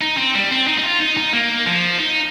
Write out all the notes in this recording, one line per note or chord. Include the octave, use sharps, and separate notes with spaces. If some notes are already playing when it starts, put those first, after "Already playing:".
D#4
C4
G3
C4
D#4
D#4
F4
D#4
D#4
A#3
F3
D#4